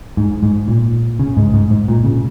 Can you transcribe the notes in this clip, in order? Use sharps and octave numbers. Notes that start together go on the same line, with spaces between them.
G#2
G#2
A#2
C#3
G#2
G#2
G#2
A#2
C#3